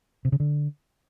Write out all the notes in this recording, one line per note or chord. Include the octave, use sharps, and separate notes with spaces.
C3
C#3
D3